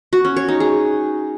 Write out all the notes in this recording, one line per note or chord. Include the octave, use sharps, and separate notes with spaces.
F#4
C#4
C#5
D#4
G#4